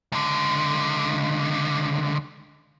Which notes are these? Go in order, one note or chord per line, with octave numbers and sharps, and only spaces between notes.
C#2 D3